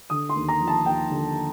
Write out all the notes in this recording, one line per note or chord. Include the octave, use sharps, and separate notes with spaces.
D3 D#6
C6
D#2
A#5
F3
A5
D#2 G5
D3